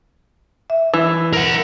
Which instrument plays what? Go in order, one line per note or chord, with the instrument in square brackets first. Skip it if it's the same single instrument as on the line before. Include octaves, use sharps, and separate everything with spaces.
[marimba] E5
[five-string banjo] E3
[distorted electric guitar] A#4 F#5